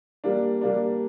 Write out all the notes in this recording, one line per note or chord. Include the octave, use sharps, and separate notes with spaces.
G3 A#3 D4
G3 A#3 D4